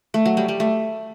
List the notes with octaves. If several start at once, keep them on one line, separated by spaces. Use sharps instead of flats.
A3
F#3
G3
G3
A3